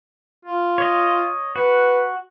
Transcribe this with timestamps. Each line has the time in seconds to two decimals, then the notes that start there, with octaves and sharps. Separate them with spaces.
0.45 F4
0.78 C#5 D#5
1.56 F#4 B4